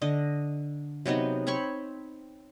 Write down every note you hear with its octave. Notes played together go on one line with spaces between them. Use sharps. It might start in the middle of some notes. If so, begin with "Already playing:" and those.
D3 D#5
C3 F#3 B3 D#4
C4 C#5 B5 C#6